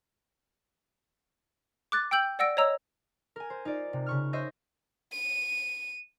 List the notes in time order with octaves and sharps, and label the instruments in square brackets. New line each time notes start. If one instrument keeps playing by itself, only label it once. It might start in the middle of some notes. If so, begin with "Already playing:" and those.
[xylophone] D6 F#6 A6
G5 E6 G6 F#7
D5 F#5 E6 A#6 D7
C#5 D#5 A#5 E6
[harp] A#4 G#5
C5
D#4 F4 D5
C3
C#3 C#6 F6
C5 C#5 D#5 E5 G6 A#6
[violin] D#7